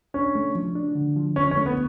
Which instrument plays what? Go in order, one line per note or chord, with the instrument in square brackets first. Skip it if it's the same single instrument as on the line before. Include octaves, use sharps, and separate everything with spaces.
[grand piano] C#4 [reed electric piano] D4
[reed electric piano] A3
F3
D4
D3
F3
[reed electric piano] F3 [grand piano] C#4
[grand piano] C#4
[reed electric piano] A3
[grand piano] B3